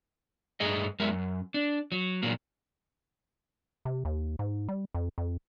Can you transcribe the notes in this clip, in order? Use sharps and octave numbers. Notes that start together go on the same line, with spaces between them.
G2 A3 G#4 D#5
F#2 G#3 A#4 E5
F#2
D4
F#3
A#2 F#3 A#3
C3
D#2
G#2
G3
F2
F2